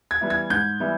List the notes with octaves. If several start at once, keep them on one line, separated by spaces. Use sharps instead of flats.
G#6
E3 G3 B3 E4
G#6
G#2 G6
E3 G3 B3 E4